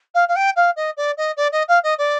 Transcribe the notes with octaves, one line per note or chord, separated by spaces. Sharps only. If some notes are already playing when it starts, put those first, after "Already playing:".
F5
F5
G5
F5
D#5
D5
D#5
D5
D#5
F5
D#5
D5